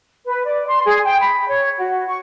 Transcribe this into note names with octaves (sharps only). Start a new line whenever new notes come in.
B4
D5
C6
G#4
G5
B5
C#5
F#4
C#6